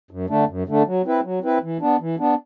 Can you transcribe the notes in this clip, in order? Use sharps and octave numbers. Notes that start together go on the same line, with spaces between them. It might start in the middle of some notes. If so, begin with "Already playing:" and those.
F#2
D3 A3 D4
F#2
D3 A3 D4
F#3
C4 E4 B4
F#3
C4 E4 B4
E3
B3 D4
E3
B3 D4